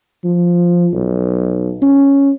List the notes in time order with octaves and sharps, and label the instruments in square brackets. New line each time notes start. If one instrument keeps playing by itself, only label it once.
[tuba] F3
B1
C#4